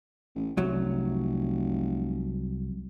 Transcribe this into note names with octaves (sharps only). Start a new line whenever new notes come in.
A1
F1 C2 F#3